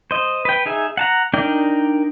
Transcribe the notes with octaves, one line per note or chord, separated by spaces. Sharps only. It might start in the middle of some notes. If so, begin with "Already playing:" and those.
C5 D#5
B4 G5
D#4 G#4 E5
F#5 A5 A#5
D4 D#4 A#4 D5 G5